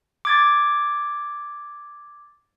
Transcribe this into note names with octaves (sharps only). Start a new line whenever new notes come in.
D6 G#6 A6